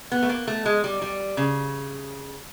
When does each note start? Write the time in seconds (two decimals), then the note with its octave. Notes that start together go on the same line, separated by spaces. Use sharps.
0.12 B3
0.22 A3
0.29 A#3
0.47 A3
0.65 G#3
0.84 G3
1.02 G3
1.37 C#3